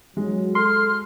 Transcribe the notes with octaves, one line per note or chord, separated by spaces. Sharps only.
F#3 G#3
A4 C6 F6